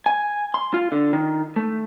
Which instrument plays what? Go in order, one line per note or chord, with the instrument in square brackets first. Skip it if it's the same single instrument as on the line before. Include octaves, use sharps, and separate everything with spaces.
[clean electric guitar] G#5
C6
F4
D3
D#3
A3